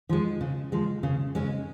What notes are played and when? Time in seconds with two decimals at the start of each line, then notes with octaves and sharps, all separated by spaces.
0.09 F3 G#3
0.41 C#3
0.72 F3 G#3
1.03 C#3
1.35 G#3 C#4